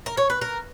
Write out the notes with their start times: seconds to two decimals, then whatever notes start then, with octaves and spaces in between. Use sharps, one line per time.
0.06 A#4
0.17 C#5
0.30 B4
0.41 A#4